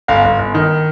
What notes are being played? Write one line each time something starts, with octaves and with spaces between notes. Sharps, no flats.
G1 F5
G1
G1
D#3